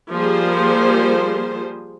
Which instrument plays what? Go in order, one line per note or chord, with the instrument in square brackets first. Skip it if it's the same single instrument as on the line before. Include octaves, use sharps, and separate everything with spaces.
[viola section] F3 G3 A#3 G#4 C5